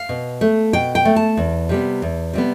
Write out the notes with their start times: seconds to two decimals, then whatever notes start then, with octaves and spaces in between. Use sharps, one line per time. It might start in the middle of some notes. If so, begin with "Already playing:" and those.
Already playing: F5
0.09 B2
0.41 A3
0.73 B2 G5
0.95 G5
1.05 A3
1.16 A5
1.37 E2
1.69 C3 G3 B3
2.02 E2
2.33 C3 G3 B3